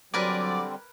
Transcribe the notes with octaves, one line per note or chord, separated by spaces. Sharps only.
D3 F#3 G3 C4 A#4 B4 D5 G#5